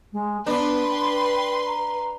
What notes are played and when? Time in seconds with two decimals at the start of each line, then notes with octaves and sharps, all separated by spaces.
0.13 G#3
0.46 B3 D4 B4 C6
0.91 G5
1.66 A#5